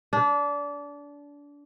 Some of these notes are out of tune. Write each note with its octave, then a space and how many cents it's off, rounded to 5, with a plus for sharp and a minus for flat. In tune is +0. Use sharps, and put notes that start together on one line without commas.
D4 -25